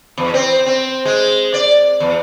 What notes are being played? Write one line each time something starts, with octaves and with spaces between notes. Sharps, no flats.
E2
C4
C4
G#3
D5
E2